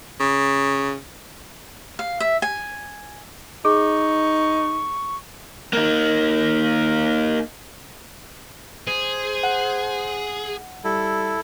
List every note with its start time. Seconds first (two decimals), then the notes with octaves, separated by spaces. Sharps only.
0.20 C#3
1.99 F5
2.20 E5
2.42 G#5
3.65 D#4 G#4 C#6
5.73 A#3 D#4
8.87 G#4 C5
9.43 F#5
10.84 G3 E4 A4